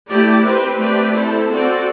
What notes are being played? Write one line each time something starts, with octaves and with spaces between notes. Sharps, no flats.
A3 E4 G4 D5
C4 G4 B4
A3 C4 G4 B4 D5
C4 E4 A4
C4 F#4 A4 D5